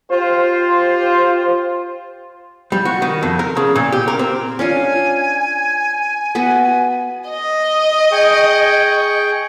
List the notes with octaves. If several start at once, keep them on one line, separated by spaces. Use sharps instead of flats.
F4 G4 C5
G3
F#4
D#3
F2
A#4
C#3
A#2
G4
A#4
C4
C#4 D4 F4 G#5
B3 F#4 B4
D#5
G#4 G5 C#6